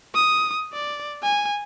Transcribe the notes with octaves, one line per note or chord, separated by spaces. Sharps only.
D#6
D5
G#5